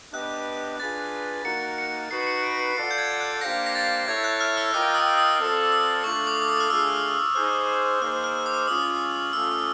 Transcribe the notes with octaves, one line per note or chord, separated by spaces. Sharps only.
B3 D4 G4 B4 D#5 F#6
D4 F4 G#4 B4 A6
A#3 D#4 F#4 A#4 C#7
C#7
D#4 F#4 B4 C7
C#7
D7
C7
F4 A4 D5 F#5 C7
G6
G#6
F#6
A#3 D4 G4 C5 F5 A#6
A#6
A6
E4 A4 C#5 E5 G#6
F#6
F6
E6
F4 A#4 D#5 G5 D6
D#6
D#6
C4 F4 A4 D5
D#6
A3 D4 F4 A4 C#6
D6
D6
D#6
F6
A3 D4 F4 G#4 E6
D#4 G#4 C5 F6
A#3 D#4 G#4 C5 F6
F6
D6
D6
G#3 C#4 F4 D#6
A3 C#4 F4 A4 E6